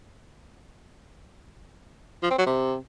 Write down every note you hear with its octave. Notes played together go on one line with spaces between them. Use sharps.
F3
C4
F#3
C3